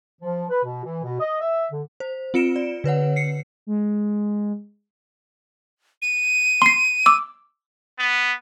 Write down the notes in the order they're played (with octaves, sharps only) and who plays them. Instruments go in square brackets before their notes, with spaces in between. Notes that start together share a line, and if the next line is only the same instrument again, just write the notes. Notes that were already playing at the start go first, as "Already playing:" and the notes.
[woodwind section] F3
B4
B2
E3
B2
D#5
E5
D3
[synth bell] C5
C4 F4 C#7 D7 E7
D5
D3 B4 C#5 F#5
C7 C#7
[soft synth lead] G#3
[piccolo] D#7
[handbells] C6 C7
D6 E6
[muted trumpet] B3